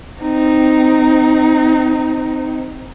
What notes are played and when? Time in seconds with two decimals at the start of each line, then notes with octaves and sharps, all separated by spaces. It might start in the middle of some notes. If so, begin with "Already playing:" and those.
0.21 C4 D#4